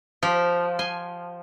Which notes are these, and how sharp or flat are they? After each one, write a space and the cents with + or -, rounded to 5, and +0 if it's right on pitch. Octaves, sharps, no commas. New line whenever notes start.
F3 +0 G4 -20
G#5 +0 C6 +0